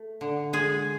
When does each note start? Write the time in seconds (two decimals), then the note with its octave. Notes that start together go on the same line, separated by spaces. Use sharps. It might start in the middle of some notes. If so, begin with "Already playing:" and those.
Already playing: A3
0.21 D3
0.53 G#3 G#4